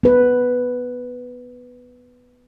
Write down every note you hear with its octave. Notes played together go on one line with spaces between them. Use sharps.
B3 B4